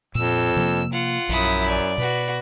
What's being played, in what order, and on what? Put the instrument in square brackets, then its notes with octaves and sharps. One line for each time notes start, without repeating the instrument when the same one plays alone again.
[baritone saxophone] F2 [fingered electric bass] A#2 [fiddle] E6
[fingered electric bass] C3 F3 A#3
[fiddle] F4 F#5
[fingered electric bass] A#1 [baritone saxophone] F#2 [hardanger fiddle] E4 D#6
[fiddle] D5 [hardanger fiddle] G#5
[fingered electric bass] B2 [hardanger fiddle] F#4 B4